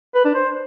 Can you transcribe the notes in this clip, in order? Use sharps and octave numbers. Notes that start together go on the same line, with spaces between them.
B4
D4
C5